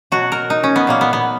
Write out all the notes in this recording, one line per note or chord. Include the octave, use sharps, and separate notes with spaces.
B2 F#3 F#4
A#4
D#4
C#4
B3
A#2 F#3 A#3
B3
B3